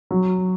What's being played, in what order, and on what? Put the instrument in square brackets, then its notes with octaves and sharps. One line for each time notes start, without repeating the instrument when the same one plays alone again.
[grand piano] F#3